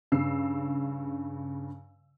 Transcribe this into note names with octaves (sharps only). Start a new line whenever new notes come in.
G2 C#3 E6 C7